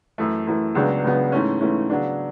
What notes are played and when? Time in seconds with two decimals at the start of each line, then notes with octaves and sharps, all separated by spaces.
0.18 F#2 E3 A3
0.47 F#2 E3 A3
0.75 C#2 C#3 F#3 B3 D4
1.04 C#2 C#3 F#3 B3 D4
1.32 G#2 E3 A3 C#4
1.61 G#2 E3 A3 C#4
1.90 C#3 F#3 B3 D4